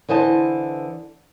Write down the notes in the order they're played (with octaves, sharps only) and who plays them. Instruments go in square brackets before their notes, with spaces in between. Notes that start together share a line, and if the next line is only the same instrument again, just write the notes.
[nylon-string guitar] D3 E3 C5 D#5 A5